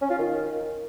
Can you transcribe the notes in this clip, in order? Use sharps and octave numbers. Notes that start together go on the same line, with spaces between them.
C#4
F4
D#3